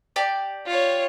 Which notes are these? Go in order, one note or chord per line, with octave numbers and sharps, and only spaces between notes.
G4 D5 A5
F4 C#5